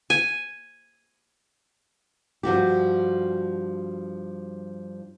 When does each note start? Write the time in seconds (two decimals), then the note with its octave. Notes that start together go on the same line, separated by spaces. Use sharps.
0.10 G#5
2.43 G2 F3 F#4 G4